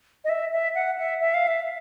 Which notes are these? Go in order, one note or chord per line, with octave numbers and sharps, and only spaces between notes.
D#5
E5
E5
F#5
E5
E5
F5
E5